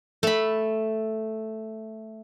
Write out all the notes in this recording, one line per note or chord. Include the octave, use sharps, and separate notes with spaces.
A3 B5